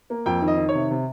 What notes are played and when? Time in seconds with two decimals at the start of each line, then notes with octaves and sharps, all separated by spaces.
0.10 A#3
0.26 F2 G5
0.42 D#3
0.48 D#5
0.57 D#3
0.69 C#5
0.75 C3
0.91 C3